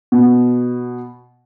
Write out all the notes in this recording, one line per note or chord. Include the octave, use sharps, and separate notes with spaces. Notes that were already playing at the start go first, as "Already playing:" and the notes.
B2